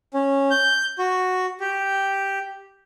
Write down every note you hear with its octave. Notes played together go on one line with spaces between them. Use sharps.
C#4
G6
F#4
G4